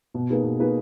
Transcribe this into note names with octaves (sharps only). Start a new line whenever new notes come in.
B2
A#3 D#4 G#4 B4
B2
A#3 D#4 G#4 B4